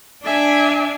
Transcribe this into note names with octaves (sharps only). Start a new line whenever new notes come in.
D4 E5 G#5